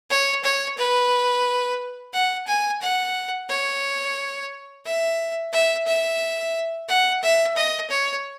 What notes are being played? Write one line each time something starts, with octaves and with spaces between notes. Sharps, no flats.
C#5
C#5
B4
F#5
G#5
F#5
C#5
E5
E5
E5
F#5
E5
D#5
C#5